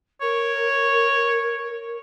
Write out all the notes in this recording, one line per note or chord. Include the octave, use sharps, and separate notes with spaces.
A#4 C#5